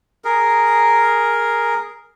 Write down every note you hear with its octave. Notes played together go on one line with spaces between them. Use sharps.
G#4 A#4